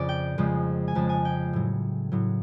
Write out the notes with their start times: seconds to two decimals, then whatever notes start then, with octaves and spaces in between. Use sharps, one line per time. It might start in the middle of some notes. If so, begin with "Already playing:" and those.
Already playing: F2 C#3 D5
0.09 G5
0.38 F2 C#3 F3 G#3
0.88 G#5
0.95 F2 C#3 F3 G#3 A5
1.09 G#5
1.25 G5
1.53 A2 F#3
2.12 A2 F#3